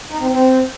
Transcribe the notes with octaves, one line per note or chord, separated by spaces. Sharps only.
D#4
C4
C4